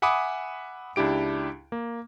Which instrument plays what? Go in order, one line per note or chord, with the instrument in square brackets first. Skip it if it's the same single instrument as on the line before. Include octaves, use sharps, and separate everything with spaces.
[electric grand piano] E5 F#5 G#5 B5 D6 D#6
C#2 D4 E4 G4 D7
A#3